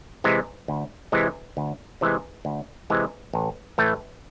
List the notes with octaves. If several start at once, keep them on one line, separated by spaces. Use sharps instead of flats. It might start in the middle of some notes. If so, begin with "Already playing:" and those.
C3 E3 G#3
D2
C3 E3 G#3
D2
C3 E3 G#3
D2
C3 E3 G#3
A1
A2 E3 A3